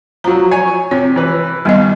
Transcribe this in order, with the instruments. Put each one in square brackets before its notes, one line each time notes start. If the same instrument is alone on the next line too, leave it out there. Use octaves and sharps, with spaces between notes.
[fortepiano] F3 F#3 [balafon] A#5
[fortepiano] C#5 G#5
[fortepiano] C3 [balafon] C#5
[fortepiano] E3 B4
[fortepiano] D#2 [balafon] G3 B3 D#5